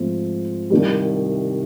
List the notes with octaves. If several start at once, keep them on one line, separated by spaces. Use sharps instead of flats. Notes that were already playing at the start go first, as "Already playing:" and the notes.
Already playing: G#2 F3 A3 C4
C2 C3 D#3 G3